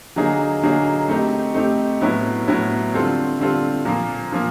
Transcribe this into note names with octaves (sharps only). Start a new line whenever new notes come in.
D3 F#3 A#3 D#4 G#4
D3 F#3 A#3 D#4 G#4
A3 C4 D#4 G4
A3 C4 D#4 G4
A2 F#3 B3 E4
A2 F#3 B3 E4
D3 G3 C4 F4 A4
D3 G3 C4 F4 A4
A#2 F3 A#3
A#2 F3 A#3